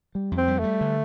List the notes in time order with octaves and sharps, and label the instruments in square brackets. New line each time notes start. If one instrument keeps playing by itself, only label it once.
[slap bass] G3
F2
[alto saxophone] C4
[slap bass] G3
[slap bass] G3 [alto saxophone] A3
[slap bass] D3